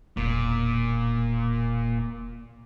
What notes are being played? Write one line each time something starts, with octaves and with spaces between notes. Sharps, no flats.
E1 A#2 E4